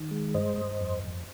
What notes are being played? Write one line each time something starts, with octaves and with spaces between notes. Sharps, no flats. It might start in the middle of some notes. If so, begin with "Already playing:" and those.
Already playing: D#3
G#3
G2 C5 D#5
G2
F2
F2